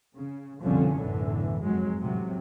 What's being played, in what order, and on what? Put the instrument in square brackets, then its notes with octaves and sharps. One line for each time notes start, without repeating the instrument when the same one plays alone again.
[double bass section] C#3
C2 F2 B2 D3 F3 C#4
B1 F#2 A2 D3 E3
F1 G#2 F#3 G#3
A1 C3 F#3